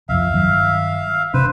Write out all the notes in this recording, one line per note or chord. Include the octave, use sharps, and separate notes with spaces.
C2 F2 E5 F5
G1 D#3 F#3
E1 C3 D4 B4 C5